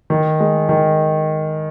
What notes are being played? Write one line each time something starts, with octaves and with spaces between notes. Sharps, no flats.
D#3
G#3
D#3